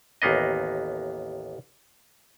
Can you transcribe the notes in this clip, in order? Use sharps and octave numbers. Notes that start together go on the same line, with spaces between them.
A1 D#2 A#3 B3 D#5